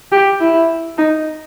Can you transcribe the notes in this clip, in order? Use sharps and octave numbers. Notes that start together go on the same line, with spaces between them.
G4
E4
D#4